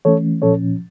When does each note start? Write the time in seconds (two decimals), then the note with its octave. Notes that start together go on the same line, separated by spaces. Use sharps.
0.05 E3 A3 C#4 A4 C#5
0.42 A#2 F3 C#4 A4 C#5